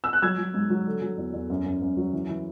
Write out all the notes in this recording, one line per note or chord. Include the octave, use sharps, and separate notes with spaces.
E6
F#6
F#3 E6 G#6
F#3
G#2
F#3
D3
F#3
E2
E2
F#2
F#2
F#2
F#3
E3
E3